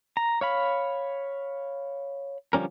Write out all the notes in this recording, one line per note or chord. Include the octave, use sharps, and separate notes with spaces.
A#5
C#5 F5 B5
D3 F3 G3 C#4 A#4